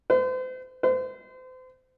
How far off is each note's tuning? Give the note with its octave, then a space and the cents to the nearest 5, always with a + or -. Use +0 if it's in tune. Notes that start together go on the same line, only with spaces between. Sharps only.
C5 -40
C5 -35